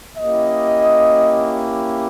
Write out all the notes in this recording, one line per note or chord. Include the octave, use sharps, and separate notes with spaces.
A#3 C#4 E4 G4 D#5